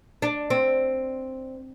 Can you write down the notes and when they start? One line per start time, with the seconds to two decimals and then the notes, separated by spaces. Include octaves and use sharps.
0.22 D4
0.50 C4